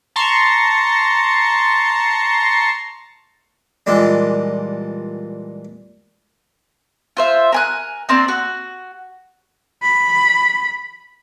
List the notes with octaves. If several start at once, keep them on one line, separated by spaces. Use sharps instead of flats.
A5 A#5 C6 C#6
A#2 E3 G3 G#3 D4
F4 C5 E5
A#4 G#5 F#6
A#3 C4 D4
F#4
B5